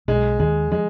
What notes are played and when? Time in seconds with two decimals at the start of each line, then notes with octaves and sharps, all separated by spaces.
0.08 B1 B2 G#3
0.39 D#2 D#3 G#3
0.72 F3 G#3